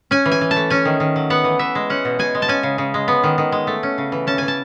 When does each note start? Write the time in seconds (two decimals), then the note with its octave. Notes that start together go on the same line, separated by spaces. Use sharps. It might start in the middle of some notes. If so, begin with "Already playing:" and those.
0.11 C#4 G#5
0.26 E3
0.32 G#5
0.41 E3
0.51 A5
0.56 A3
0.70 C#4 G#5
0.85 D#3
1.00 D#3
1.16 F#3
1.30 B3 F#5
1.44 E3
1.59 E3 E5
1.75 G#3
1.90 C#4 F#5
2.05 B2
2.19 B2 G#5
2.35 G#3
2.42 A5
2.48 C#4 G#5
2.63 C#3
2.78 C#3
2.94 G#3
3.08 B3
3.23 D#3
3.38 D#3
3.52 G#3
3.67 A3
3.83 C#4
3.98 C#3
4.12 E3
4.27 C#4 A5
4.38 E3 G#5
4.48 A5